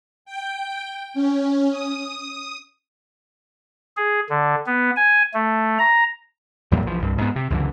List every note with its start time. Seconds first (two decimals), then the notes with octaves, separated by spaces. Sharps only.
0.25 G5
1.14 C#4
1.70 D#6
3.97 G#4
4.29 D3
4.66 B3
4.96 G#5
5.34 A3
5.79 A#5
6.71 E2 A#2 F#3 G3
6.86 A#1 E3 F3
7.00 C2 G2
7.18 G#2 B3
7.36 C3
7.50 C#2 F#2 D3 E3